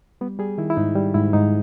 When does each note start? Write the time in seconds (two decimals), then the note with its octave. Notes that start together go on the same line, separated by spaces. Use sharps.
0.21 G3 B3
0.39 G3 G#4
0.58 D#3 E4
0.70 E4
0.77 G#2 D#4
0.95 G3
1.14 G#2 E4
1.33 G#2 D#4